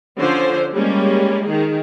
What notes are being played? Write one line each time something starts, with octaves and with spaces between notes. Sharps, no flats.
D3 F3 C#4 C5
G3 G#3 A#3 C#4
D#3 G#4